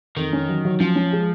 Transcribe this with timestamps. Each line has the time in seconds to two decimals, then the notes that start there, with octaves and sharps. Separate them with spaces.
0.17 F2 D#3
0.33 C#4
0.49 F#3
0.65 F#3
0.80 F3 C#4
0.96 C#4
1.13 G#3